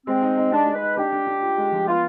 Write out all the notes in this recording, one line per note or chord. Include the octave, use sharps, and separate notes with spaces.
G#3 C4
D#4
D#4
G#3 D4
G#3
B4
D#4
D4 G4
D4
D4
F4
G#3
F3
B3 F4